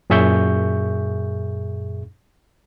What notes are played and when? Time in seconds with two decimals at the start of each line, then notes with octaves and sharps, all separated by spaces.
0.10 F#2 A#2 G#4 E5 C#6 G6